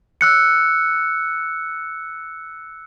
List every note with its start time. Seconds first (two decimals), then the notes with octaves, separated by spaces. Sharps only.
0.21 E6 F#6 C#7